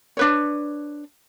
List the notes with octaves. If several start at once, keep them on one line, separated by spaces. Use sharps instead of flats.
D4 B4 C#5